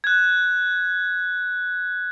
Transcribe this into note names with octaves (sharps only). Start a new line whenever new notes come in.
F#6 G#6